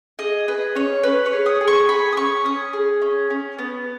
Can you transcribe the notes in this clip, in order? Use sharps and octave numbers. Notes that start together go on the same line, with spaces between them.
G#4 D#5
G#4 B4
C#4 C#5
C#4 B4
C#5
G#4
D#6
G#4
C#6
G#4 B5
D#6
C#4 C#6
C#4 D#6
G#4
C#4
C#4
B3